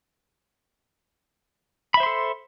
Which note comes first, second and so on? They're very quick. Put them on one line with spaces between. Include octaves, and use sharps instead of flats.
B5 E5 C5 C6 A4